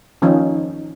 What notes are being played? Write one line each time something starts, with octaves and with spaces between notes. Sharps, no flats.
D#3 F3 C#4 D#4